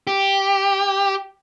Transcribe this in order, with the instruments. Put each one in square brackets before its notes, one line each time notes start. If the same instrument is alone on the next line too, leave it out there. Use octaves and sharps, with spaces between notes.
[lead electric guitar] G4